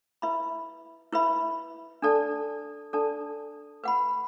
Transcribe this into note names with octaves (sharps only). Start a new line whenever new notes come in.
E4 B4 E5 B5
E4 B4 E5 B5
D4 A4 D5 A5
D4 A4 D5 A5
B4 F#5 B5